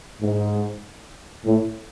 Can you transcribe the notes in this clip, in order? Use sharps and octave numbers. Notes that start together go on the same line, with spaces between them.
G#2
A2